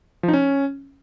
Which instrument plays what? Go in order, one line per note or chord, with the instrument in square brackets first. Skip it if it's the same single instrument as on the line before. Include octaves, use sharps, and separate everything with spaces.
[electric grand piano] F3
D#4
C#4